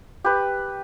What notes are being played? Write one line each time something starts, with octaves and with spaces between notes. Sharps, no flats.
G4 B4